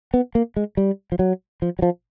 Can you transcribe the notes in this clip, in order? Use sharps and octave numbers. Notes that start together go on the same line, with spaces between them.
B3
A#3
G#3
G3
F3
F#3
F3
F#3
F3